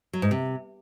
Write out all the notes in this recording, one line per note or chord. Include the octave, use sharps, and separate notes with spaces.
F#3
G#2
C3